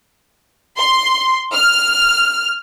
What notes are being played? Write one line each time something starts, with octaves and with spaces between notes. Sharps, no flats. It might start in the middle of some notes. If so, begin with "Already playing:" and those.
C6
F6